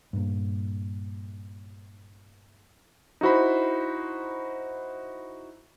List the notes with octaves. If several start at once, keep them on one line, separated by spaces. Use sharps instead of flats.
G2 A#2
D#4 E4 F#4 C5 B5